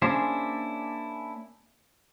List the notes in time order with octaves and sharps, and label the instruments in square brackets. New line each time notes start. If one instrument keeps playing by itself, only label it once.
[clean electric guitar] A#3 C#4 D4 E4 G#4 C5